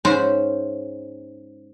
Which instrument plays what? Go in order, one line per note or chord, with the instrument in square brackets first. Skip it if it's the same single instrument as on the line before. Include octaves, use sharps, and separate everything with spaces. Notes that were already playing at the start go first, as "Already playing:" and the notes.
[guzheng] G#2 C#4 C5 B5